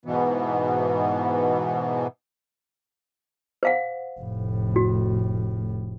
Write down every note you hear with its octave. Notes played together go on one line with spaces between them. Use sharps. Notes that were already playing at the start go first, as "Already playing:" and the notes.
G#2 B2 E3 B3
C5 F5 F#5
F1 A2
F#4